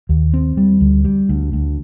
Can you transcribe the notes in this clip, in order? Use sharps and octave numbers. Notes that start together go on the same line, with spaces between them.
D#2
C4
G3
D2
G3
D2
D2